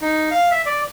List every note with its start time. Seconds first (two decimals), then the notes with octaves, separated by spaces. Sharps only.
0.01 D#4
0.31 F5
0.51 E5
0.66 D5